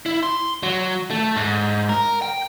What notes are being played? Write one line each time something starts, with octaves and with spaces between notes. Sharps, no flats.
E4
C6
F#3
A3
G#2
A#4
G5